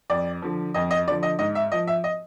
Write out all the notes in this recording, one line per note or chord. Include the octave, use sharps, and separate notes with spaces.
F2 D5
D3 F3
F2 D#5
D#5
D3 F3 D5
D#5
G#2 D#5
E5
F3 D#5
E5
D#5